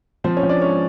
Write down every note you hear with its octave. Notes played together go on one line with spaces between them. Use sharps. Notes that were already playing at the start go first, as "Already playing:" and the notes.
F3 C4 C5
C#4 C#5
F3
D4 D5
G#2 C#4 C#5